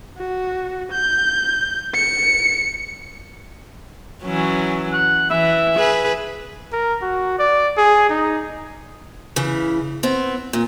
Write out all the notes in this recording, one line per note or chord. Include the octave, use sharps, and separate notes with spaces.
F#4
G6
C#7
E3 F#3 C#4
F#5
E3 E5
G#4 B4
A#4
F#4
D5
G#4
D#4
C#3 E3
B3 C4
A#2